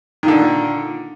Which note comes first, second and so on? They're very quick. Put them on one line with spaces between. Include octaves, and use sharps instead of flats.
D#3 A#2 D3